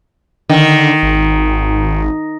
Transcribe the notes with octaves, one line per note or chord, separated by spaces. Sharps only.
D3 D#3
G#1